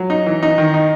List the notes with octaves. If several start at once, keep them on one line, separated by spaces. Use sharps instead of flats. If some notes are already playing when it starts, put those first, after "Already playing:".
Already playing: F#3
D#4
E3
D#4
D#3
D#4